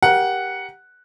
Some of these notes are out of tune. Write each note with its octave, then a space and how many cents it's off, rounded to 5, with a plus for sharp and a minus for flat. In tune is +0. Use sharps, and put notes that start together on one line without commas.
G4 +0 A#4 +25 F#5 +0